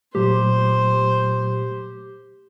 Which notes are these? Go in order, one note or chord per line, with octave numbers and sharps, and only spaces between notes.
A#2 F#3 A3 G4 C5